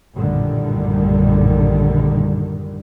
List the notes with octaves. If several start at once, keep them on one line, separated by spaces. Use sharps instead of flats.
A#1 F#2 A2 D3 D#3 G3